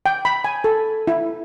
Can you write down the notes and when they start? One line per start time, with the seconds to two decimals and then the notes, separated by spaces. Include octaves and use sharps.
0.06 G5
0.25 B5
0.44 G#5
0.64 A4
1.07 E4